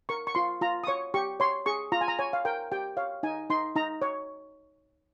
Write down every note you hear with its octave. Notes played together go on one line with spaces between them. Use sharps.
A#4 C#6
C#6
F4 C6
F4 A#5
D#6
C#5 C#6
G4 C#6
C#5 C6
G#4 C#6
F4 A#5
G#5
A#5
C#5 G#5
F5
A#4 G5
G4 G5
C#5 F5
D#4 G#5
D#4 C6
D#4 A#5
C#5